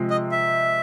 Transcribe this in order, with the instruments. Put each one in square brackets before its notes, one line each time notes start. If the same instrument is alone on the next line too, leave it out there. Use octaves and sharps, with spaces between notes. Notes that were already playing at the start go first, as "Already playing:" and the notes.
Already playing: [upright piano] C3 F3 G#3
[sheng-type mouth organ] D#5
E5